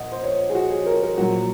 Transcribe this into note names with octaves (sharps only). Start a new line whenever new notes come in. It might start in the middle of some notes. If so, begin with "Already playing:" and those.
Already playing: A#1 A#2 D#5 F#5
C5
C#5
G#4
F#4
G#4
A#4
A#4
A#1 A#2 F#3 F#4